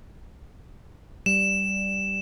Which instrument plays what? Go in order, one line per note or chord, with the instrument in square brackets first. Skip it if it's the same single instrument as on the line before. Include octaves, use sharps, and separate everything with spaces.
[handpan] G3 [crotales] E7